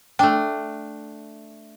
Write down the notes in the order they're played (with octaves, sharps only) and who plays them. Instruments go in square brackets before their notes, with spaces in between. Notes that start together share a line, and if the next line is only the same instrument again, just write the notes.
[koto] A3 D4 [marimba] G5